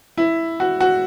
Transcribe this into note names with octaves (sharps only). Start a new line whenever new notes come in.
E4
F#4
F#4